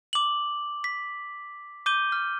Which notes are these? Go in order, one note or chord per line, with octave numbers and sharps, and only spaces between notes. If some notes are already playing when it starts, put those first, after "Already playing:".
D6 F#7
B6
D6 G6 D#7 G7
F6